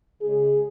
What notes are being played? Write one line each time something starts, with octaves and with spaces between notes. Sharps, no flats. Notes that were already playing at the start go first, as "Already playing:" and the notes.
C#3 G#3 C#4 G#4